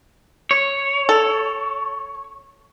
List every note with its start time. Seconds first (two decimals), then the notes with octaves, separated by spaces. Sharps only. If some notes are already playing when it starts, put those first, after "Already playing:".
0.51 C#5
1.09 A4